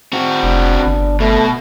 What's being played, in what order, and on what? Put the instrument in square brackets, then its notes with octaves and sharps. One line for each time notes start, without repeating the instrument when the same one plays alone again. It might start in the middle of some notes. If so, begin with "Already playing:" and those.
[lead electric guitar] C4 F#4
[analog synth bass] F1 [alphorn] D4
[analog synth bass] G1
[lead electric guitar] B2 [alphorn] A3